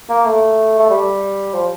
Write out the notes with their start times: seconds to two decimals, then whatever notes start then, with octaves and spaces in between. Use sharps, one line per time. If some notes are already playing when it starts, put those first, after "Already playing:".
0.09 A#3
0.25 A3
0.79 A3
0.90 G3
1.54 F3